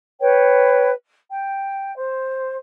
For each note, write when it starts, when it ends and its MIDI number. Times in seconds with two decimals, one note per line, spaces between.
0.21 0.90 71
0.21 0.90 73
0.21 0.90 79
1.29 1.93 79
1.95 2.53 72